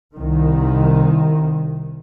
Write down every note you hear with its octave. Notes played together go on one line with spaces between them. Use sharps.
C2 D#3